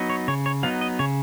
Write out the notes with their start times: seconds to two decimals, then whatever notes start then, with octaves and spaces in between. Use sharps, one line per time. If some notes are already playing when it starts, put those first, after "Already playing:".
Already playing: F#3 B3 D#4
0.10 C#5
0.28 C#3 C#5
0.46 C#5
0.63 F#3 B3 D#4 F5
0.81 D#5
0.99 C#3 C#5